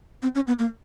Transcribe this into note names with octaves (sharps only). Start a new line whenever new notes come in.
C4
C#4
B3
A#3